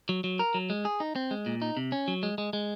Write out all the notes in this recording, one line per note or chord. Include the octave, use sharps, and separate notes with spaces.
F#3
F#3
A#4
F#3
G#3
G#4
D#4
C4
G#3
A#2
D#4
C3
C#4
F#3
G#3
G#3
G#3